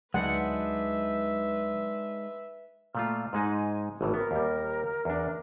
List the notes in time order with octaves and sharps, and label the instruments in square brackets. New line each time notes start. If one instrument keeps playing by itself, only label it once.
[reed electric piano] D2 F#3 [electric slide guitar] G#3 D4 D#4 [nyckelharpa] B4 E5 [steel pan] F#5
[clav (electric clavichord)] A#2 A3 F4 [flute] F6
[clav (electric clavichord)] G#2 G#3 D#4 [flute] G#5
[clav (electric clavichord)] G#1 A2 E3
[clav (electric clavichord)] B3 [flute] A#4
[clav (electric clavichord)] D#2 G3
E2 D4